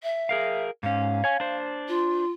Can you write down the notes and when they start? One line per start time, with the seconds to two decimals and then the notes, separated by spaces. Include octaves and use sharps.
0.02 E5
0.29 G#4 A#4 F5
0.83 G#2 C#4 F5
1.24 C#5 G#5
1.40 D4 C5
1.88 F4